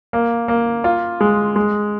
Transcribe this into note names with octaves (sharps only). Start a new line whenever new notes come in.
A#3
A#3
F4
G#3
G#3